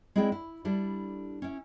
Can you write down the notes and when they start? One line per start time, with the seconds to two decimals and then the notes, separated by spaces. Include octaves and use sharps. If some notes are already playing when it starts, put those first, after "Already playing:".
0.16 G#3 C4 E4 G#4 D5 G5
0.32 E4
0.65 G3 D4 E4 A4
1.42 C#4 E4